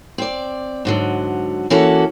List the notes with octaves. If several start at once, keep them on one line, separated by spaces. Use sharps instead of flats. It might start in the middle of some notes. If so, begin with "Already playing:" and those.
C4 D5
G#2 D3 F#3
E3 A#3 C#4 F#4 A4